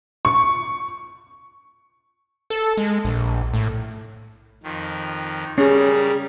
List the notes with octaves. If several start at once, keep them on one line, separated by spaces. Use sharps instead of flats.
C#6
A4
G#3
A#1
A2
F2 D#3
C#3 G3 C#4 G#4 A#4